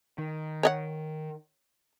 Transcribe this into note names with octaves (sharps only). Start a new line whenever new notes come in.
D#3
C#5 D5 F#5